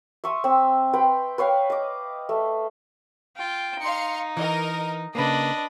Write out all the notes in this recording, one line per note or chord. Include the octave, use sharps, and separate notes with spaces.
E5 C6 C#6 D#6
C4 E6
B4 G5 C6
B4 C#5 F5 G5
D#5 D6
A3
F4 G5
D#4 F5 C6 C#7
E3 A#4 D#5
C#3 A#3 D4 B4 D#5